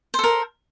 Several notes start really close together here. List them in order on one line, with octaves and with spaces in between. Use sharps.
C5 A4 A#4